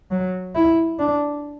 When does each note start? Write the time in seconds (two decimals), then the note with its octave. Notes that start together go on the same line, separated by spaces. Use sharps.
0.11 F#3
0.55 E4
0.99 D4